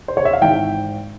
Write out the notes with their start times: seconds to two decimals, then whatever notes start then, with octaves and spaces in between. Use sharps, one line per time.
0.08 C5
0.17 C#5
0.25 E5
0.33 F5
0.41 G#1 G#2 E3 G5